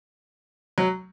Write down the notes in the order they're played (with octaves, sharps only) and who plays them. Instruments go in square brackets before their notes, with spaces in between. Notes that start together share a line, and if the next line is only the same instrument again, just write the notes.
[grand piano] F#3